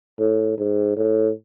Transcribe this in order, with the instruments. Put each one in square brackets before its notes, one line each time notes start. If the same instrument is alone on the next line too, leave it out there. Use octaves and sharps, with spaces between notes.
[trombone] A2
G#2
A2